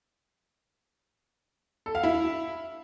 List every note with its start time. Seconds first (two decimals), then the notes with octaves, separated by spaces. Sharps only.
1.86 A4
1.95 F5
2.03 E4